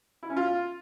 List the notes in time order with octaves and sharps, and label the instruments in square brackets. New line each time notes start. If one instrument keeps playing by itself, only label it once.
[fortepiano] E4
C#4
F4